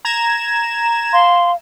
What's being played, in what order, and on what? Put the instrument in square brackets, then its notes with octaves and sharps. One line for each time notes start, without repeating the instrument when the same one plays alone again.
[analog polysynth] A#5 G#6 E7
[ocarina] F5 [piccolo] C6